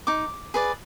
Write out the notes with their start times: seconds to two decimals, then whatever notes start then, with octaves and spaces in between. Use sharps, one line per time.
0.07 D#4 D6
0.54 G#4 B4 D5